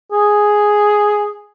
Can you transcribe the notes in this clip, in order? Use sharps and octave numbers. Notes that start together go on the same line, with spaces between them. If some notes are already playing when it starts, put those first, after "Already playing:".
G#4